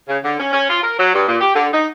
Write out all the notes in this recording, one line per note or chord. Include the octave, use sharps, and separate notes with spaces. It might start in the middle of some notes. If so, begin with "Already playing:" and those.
C#3
D3
C#4
C#4
F4
A#4
F#3
G2
A#2
G4
D3
D#4